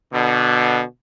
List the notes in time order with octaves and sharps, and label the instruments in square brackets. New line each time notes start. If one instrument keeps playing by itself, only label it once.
[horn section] B2 D3